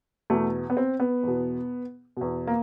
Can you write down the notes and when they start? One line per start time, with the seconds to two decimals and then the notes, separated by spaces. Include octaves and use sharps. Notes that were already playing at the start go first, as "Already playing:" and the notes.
0.30 E2 B2 A3
0.70 B3
0.77 C4
1.00 B3
1.23 E2 B2
2.17 E2 B2
2.47 A#3